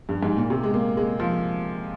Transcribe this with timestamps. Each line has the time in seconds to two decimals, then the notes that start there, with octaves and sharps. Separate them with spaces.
0.09 G2
0.23 G#2
0.36 A#2
0.50 C3
0.64 G#3
0.74 A#3
0.97 G#3
1.20 F3